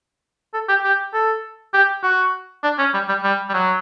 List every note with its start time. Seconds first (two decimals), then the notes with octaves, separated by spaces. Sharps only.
0.54 A4
0.68 G4
0.84 G4
1.13 A4
1.74 G4
2.03 F#4
2.63 D4
2.79 C#4
2.94 G3
3.08 G3
3.23 G3
3.49 G3
3.54 F#3